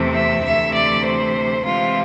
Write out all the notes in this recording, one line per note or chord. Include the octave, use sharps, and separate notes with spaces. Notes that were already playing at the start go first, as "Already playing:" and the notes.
Already playing: E2 C3 E3 A3 C4
E5
D2 C3 E3 A3 E5
D5
C5
C3 E3 G#3 C4 F4